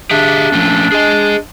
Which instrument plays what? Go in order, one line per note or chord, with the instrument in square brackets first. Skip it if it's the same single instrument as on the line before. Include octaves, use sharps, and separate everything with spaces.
[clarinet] D4 [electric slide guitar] G4 G#4 E5
[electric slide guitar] F3 A3 C#4
G#4 D#5